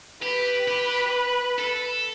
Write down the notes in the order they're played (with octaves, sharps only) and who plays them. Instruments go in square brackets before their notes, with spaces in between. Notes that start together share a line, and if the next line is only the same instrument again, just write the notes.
[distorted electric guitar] G4 [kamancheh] B4
[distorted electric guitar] G4
A4